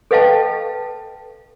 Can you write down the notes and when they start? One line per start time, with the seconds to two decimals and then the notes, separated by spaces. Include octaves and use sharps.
0.11 A4 B4 D#5 F5 G5 A5